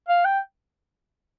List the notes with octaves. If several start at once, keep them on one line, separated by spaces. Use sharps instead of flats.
F5
G5